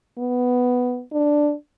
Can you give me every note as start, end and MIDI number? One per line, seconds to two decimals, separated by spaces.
0.18 1.02 59
1.12 1.53 62